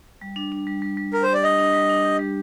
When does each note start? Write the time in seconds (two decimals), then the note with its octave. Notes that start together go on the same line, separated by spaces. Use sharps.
0.22 G3
0.36 D4
0.52 D4
0.67 G3
0.82 G3
0.97 G3
1.13 G3 A#4
1.23 C5
1.28 G4
1.34 D5
1.44 D4 D#5
1.58 D4
1.74 G3
1.89 D4
2.05 G4
2.19 G3